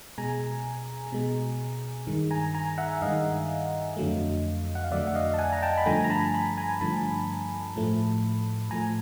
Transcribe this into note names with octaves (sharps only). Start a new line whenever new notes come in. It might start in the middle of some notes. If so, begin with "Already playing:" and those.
B2 G#3 G#5 A#5
B2 G#3
G2 D#3 G#3
G#5 A#5
G#5 A#5
E5 F#5
G2 D#3 G#3 D#5 F5
F2 D3 F#3 A3
F#5
F5
F2 D3 F#3 A3 D5 E5
F#5
D#5 F5
A5
F#5 G#5
A#5
G5 A5
B5
G2 D3 F3 A3 G#5 A#5
A#5
A5 B5
A5 B5
G#5 A#5
G2 D3 F3 A3 A5 B5
A2 F3 A3
A2 F3 A3 G#5 A#5